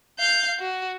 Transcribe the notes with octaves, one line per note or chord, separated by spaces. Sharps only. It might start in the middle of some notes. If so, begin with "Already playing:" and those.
F5 G6
F#4